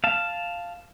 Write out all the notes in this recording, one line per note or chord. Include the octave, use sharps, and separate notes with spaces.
F5 A5